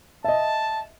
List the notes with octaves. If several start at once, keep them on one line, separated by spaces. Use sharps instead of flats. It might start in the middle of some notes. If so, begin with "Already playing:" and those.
D#5 E5 A5